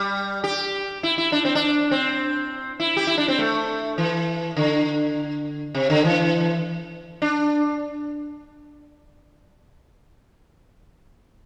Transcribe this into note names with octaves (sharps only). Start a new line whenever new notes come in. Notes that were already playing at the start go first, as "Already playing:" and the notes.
Already playing: G3
G4
E4
E4
D4
C4
D4
C4
E4
G4
E4
D4
C4
A3
E3
D3
C3
D3
E3
D4